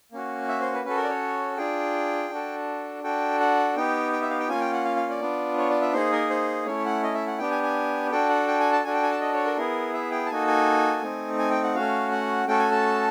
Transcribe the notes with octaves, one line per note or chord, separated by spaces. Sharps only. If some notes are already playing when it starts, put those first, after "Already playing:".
A#3 C#4 F#4
E5
C5
B4
C#4 F#4 A4 B4
A#4
D5
C#5
D4 F4 G#4 G5
D4 F#4 A4
D4 F#4 A4 G5
F#5
B3 D#4 G4 G5
G5
E5
F5
G5
A#3 C#4 F4 G#5
G5
F#5
F5
F5
D5
B3 D4 F4
C#5
D5
E5
A#3 D#4 G#4 C5
A#4
C5
A3 C#4 E4 C#5
F#5
D#5
E5
F#5
B3 D4 G4 G5
G#5
G#5
D4 F#4 A4 G5
F#5
G5
G#5
A5
D4 F#4 A4 G#5
G5
G#5
A5
D#5
C#5
A#4
B3 E4 G#4 A#4
E5
G5
A5
A#3 D#4 F#4 A4 G#5
G#5
A3 C4 D#4
G#5
G5
F#5
A3 C#4 F#4 F5
F#5
A3 C#4 F#4 A4 G5
G#5
A5